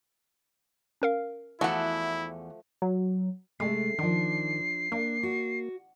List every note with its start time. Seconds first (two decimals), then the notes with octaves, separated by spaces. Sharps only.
1.02 C#4 A#4 F5
1.61 E2 F3 A3 E4 F#4 F#5
2.82 F#3
3.60 C3 G#3 A3 C7
3.99 D#3 F3 D4
4.92 A#3 D4
5.23 F#4